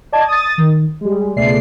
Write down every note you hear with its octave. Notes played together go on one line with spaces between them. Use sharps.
D5 D#5 A5 G#6
D#6 A6
D#3
G3 G#3
C#2 B2 G#3 A3 D5 C7